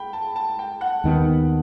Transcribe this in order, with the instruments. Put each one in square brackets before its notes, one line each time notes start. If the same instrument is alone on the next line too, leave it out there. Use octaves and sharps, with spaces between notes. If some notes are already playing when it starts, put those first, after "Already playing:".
Already playing: [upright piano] G5 B5
A5
A5
G5
F#5
[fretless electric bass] D#2 D#3 G3 B3